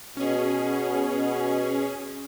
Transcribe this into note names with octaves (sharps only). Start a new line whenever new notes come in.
B2 C#4 G#4